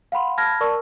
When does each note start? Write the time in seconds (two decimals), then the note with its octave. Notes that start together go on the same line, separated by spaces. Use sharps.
0.12 F5 F#5 B5 C6
0.37 A5 B5 F6 G#6 A#6
0.60 A#4 D5 A5 C#6 E6